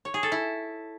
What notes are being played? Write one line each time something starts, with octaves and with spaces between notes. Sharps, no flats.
C#5
G#4
A4
E4